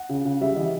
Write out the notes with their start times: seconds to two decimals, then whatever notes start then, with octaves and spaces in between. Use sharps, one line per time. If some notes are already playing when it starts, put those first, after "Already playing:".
Already playing: F#5
0.09 C#3
0.25 C#3
0.41 G3 E5
0.56 E3 D#5